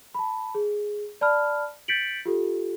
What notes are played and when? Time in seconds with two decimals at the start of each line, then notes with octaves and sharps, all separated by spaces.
0.14 A5 B5
0.55 G#4
1.21 D5 A5 B5 F6
1.88 G6 A6 B6 C#7 D7 F#7
2.26 F4 G4 A4